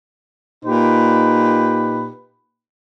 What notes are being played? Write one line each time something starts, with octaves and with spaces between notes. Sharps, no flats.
A#2 D#4 G4 B4